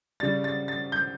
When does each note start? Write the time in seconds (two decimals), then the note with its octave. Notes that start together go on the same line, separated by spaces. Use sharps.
0.20 C#3 G3 A6
0.44 A6
0.68 A6
0.92 G6